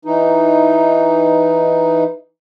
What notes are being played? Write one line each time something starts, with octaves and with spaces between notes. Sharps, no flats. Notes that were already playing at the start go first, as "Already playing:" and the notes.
E3 D#4